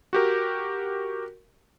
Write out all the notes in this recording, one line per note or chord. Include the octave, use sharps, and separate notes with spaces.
F#4 G4 A#4